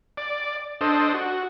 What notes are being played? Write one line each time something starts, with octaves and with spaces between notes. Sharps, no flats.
D5
D4 A4 C5 D#5
F#4